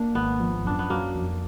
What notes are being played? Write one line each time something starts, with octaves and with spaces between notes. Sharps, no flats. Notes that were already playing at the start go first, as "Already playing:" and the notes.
Already playing: A#3 D4
G#1 B3
F3
F#2 D4
B3
F#3 A#3
F2